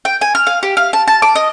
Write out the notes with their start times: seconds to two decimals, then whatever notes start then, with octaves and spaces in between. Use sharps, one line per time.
0.05 G5
0.21 G#5
0.35 F6
0.47 F5
0.63 G4
0.77 F5
0.93 A5
1.08 A5
1.22 D6
1.35 D#5